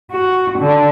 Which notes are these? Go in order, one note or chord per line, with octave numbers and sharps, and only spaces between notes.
F#4
D3